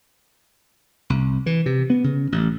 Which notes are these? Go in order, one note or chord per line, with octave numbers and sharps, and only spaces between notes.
C2
E3
C3
B3
C#3
A1